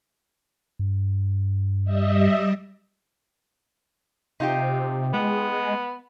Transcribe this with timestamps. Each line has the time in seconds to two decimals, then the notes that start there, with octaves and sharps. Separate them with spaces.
0.79 G2
1.84 G3 D#5 E5
4.40 C3 D#4 F4 G4
5.13 G#3 B3